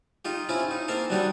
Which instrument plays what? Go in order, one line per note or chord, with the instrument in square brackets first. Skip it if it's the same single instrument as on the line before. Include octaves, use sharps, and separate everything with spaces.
[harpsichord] D#4 F4 G4
C4 C#4 E4 F4
D#4
A#3 C4 A#4 F5 A5
F#3 G3 D4 D#4 G4